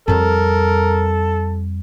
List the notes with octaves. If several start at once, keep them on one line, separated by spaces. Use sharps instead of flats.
F2 G3 A4 A#4